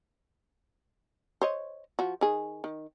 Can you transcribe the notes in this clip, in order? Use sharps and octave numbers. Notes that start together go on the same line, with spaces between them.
C5 C#5 D#5
F3 F#4
D#3 G#4
D#3